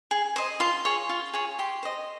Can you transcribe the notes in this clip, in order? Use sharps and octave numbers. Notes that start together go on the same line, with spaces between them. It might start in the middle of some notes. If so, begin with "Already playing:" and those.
G#4
C5 D#5
F4 C6
G#4 C#5
F4
G#4 C#5
G4 C6
C5 D#5